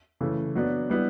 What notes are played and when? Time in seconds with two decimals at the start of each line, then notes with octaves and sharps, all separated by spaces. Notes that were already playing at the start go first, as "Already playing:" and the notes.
0.21 C#3 E3 A3
0.55 F#3 B3 D4
0.90 G3 B3 E4